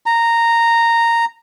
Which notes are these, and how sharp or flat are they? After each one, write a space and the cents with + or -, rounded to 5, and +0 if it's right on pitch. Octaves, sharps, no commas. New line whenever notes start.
A#5 -10